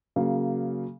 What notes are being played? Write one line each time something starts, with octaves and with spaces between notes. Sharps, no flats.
C#3 F#3 A#3